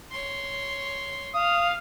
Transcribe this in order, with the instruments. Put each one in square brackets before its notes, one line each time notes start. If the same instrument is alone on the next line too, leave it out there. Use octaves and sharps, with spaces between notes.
[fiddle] C#5 C6
[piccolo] F5 [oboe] D#6